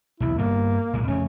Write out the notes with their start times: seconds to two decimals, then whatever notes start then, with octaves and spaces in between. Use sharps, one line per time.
0.20 B1 E2 C3 E4
0.38 G2 G3 A#3 B3
0.93 B1 A#2 G#3
1.08 F2 C#3 A3 C#4